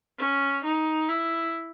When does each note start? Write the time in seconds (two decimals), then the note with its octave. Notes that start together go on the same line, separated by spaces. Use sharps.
0.18 C#4
0.65 D#4
1.09 E4